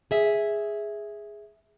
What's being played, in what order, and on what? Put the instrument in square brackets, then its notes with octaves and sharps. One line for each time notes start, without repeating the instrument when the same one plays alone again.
[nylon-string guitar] G#4 E5